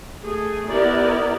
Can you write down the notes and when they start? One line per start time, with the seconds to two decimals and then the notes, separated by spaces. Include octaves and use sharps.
0.24 A3 G#4
0.69 B3 E4 G4 A#4 D5